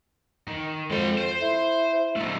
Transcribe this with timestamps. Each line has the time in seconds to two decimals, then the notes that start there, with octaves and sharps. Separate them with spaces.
0.48 D#3
0.91 F2 G#3 G5
1.18 C5
1.41 E4
2.16 F#3 A3